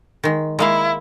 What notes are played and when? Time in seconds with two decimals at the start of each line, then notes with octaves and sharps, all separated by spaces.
0.24 D#3 G#3
0.59 G#3 A#3 E4 F5